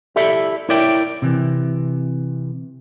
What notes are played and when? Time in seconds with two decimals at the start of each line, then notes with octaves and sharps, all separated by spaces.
0.16 E4 G4 A4 D5 E5
0.69 E4 A#4 C#5 D5 E5 G5
1.22 C3 E3